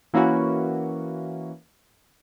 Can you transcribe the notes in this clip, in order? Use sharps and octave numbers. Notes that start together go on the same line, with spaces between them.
E3 A#3 C#4 E4 F#4